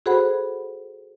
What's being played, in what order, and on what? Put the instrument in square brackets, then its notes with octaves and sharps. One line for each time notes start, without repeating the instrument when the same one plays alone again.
[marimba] F#4 G#4 A4 C5 F#5 B5